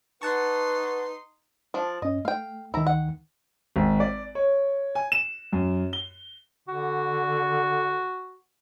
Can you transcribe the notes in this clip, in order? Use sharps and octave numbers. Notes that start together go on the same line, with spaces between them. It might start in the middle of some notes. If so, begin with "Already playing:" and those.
D#4 B4 F#5 A5 C6 C#6
F3 D4
G2 C#4 D#5
A3 F5 G5
D2 D#3 E4 A#5
F#5
G#1
D5
C#5
G#5
E7
F#2
G7
D3 F#4